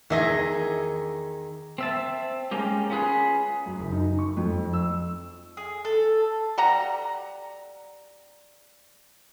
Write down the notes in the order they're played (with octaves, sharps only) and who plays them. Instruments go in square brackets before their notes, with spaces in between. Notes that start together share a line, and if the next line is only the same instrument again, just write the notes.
[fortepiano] E2 E5 [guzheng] D#3 G#4 D#5
[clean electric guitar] C4 E5 A5
G#3 A#3 C#4 G4
C#4 F4 G#4 B4
[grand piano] F#2
F#1
D#4
C#6
F2
E6
[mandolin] G#4
A4
[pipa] G3 F#5 A#5